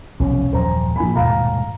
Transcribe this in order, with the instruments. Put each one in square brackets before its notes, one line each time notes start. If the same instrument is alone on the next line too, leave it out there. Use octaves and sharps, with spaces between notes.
[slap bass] F1 B1 C3 [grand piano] C#4
[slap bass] D#1 F#2 F3 [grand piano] C5 A#5
[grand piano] A#1 G#5 B5
[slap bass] D#1 G#2 B2 [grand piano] F5 A#5